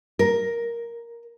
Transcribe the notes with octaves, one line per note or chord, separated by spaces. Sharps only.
A#4